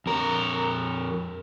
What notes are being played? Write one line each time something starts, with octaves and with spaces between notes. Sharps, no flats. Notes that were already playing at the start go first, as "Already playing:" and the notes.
F2 A#4